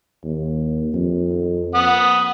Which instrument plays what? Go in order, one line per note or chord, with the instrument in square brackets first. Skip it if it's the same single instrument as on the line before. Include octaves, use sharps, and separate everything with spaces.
[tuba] D#2
F2
[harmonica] F#5 D#6